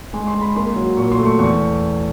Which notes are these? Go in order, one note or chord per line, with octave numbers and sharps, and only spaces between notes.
G#3 C6
C6
G#3
B5
A#3 C6
F#3
A#2 C#6
C6
A3
C#6
E2 C#6